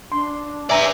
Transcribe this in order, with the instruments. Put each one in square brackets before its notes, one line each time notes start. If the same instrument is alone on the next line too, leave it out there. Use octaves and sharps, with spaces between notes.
[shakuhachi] D4 [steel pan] C6
[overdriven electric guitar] B4 D5 [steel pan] E5 G#5 A#5